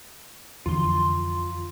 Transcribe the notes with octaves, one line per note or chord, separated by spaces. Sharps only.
F2 D3 E3 F4 C6